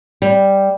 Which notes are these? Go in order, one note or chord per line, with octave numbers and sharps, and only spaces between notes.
G3